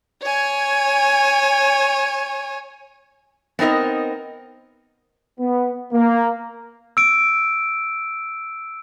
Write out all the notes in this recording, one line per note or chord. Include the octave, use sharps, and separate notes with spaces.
C#5 G#5
B3 C4 D#4 A#4 D#5
B3
A#3
E6 D7